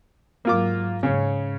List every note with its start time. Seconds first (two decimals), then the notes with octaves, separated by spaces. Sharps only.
0.45 G#2 F#3 A#3 F4 D6
1.03 G#2 C#3 C#4